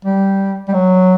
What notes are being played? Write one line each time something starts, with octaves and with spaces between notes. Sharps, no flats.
G3
G3
F#3